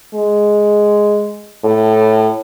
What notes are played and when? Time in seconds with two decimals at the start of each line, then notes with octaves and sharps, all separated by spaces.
0.14 G#3
1.64 A2